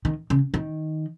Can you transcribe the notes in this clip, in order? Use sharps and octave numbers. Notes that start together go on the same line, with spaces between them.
D#3
C#3
D#3